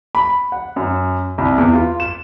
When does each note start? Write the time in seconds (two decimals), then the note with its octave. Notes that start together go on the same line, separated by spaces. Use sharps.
0.15 B5
0.52 F#5
0.76 F#2
1.38 C2
1.58 E2
1.73 F4
2.00 E7